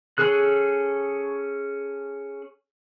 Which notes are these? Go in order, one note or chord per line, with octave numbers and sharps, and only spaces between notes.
C#4 G#4 A4 F#6